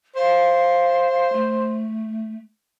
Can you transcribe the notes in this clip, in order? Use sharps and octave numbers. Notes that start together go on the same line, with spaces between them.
C5 F5
A3